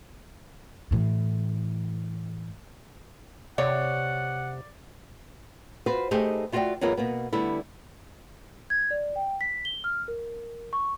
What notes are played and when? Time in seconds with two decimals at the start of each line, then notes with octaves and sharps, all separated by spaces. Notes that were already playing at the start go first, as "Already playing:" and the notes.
0.91 A2 E3
3.58 C3 C#5 D5 F#5
5.86 F4 F#4 B4 C5
6.11 A3 D#4 G4 G#4 C5 D#5
6.52 A3 F4 F#4 B4 D5 G5
6.81 F#2 E3 G#3 B3 F4 A#4
6.97 B2 A#3 B3
7.33 D3 G3 A3 B3 E4
8.70 G#6
8.91 D5
9.16 G5
9.41 B6
9.65 G7
9.84 F6
10.08 A#4
10.73 C#6